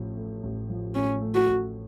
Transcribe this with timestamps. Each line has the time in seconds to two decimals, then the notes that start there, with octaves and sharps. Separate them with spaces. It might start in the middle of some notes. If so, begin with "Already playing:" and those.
Already playing: A1 A2 F3
0.17 A3
0.43 A1
0.69 F3
0.95 A2 C#4
1.21 A3
1.35 F#4
1.48 A1